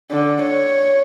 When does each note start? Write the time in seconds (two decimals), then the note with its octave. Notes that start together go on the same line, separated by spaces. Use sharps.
0.11 D3
0.42 C#5